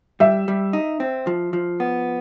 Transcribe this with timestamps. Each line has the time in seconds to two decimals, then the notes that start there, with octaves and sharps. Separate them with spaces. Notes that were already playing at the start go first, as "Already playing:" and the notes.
0.20 G3 E5
0.48 G3
0.73 D#4
1.00 C4
1.27 F3
1.53 F3
1.80 B3